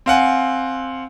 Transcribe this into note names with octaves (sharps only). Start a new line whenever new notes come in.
C4 F5 F#5 G#5